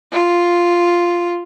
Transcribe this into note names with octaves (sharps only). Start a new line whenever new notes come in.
F4